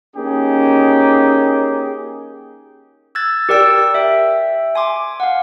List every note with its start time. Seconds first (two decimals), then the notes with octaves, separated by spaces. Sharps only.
0.16 A#3 C#4 D#4 G4 G#4
3.15 E6 F#6 G#6 A6
3.49 G4 A#4 D5 G5 E6
3.94 E5 G5
4.75 G#5 C6 D6
5.20 F5 F#5